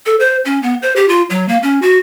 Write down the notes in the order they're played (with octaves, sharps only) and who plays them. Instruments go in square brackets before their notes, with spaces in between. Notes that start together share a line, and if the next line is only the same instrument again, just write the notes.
[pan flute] A4
C5
C#4
B3
C5
G4
F4
F#3
A#3
C#4
F#4